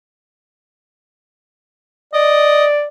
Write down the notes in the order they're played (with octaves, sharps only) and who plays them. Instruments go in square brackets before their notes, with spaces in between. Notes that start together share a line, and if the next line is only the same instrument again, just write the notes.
[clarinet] D5 [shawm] D#5